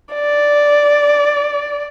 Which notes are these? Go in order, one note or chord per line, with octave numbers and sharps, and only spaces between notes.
D5